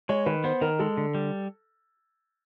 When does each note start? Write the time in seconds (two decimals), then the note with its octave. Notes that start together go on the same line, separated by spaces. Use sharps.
0.09 G#3 C#5
0.26 D#3 B4
0.44 B3 C5
0.61 D#3 A#4
0.79 G#3 A4
0.97 D3
1.15 G3